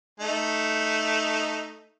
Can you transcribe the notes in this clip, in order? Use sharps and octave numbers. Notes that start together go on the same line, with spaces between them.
A3 D#4